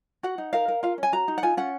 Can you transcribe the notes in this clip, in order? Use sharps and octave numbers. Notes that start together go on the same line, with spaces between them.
F#4 F#5
D#4
A#4 F5
A#4
F4 F5
C#4
G#5
F#4 A#5
D#4
F#5
F4 G#5
C#4 F#5